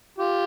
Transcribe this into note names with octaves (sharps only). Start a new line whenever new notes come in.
F4 G4